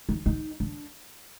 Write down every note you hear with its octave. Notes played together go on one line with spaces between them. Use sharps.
D#4
D#4
D4